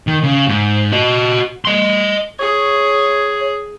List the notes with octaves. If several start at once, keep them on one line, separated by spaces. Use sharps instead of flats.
D#3
C#3
G#2
F#4 D#5
D#5 C6
G#4 C#5